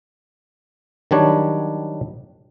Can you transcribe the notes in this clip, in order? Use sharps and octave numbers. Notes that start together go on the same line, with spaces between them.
D#3 F#3 G3 D4 C#5